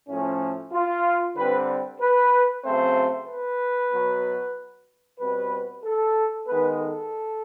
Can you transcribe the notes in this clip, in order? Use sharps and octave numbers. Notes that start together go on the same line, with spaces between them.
A2 F3 A3 C#4
F4
D3 G3 C4 B4
B4
C#3 F#3 A3 C4 C5
B4
B2 F#3 B3
B2 G3 C4 B4
A4
D#3 G#3 B3 B4
A4